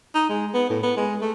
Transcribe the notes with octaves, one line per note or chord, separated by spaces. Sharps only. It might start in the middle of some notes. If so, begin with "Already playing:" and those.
D#4
G#3
B3
A2
B3
G#3
A3